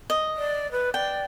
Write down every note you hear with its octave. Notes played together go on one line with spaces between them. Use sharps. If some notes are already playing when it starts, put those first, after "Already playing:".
D#5
D5
B4
D5 G5